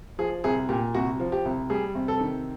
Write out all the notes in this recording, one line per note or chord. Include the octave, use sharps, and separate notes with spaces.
F3 G#4
C2 G#4
A#2 G4
C2 F#4
F3
G4
C2
G3 G#4
C3
A4
D#3